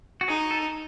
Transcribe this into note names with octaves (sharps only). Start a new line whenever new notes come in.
F#4
D#4 G#4
A4